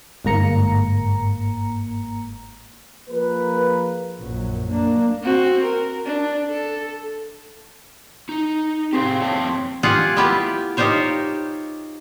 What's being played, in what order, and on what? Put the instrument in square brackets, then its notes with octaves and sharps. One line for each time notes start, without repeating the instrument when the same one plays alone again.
[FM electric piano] G1 G#2 A#3 A#5 C#7
[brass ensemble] F3 A#3 G#4 A#4 B4
[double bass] A#1 F#2
A#3 D4
[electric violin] C4 F#4
A#4
D4
A4
[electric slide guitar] D#4
[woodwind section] C4 C6 [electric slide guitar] G4 G#4 F5
[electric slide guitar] F2 C#5 A5
[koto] F4 G4 G#4 F#5 G5
B3 E4 F4 G4 B4
D#4 F4 G4 C5 C#5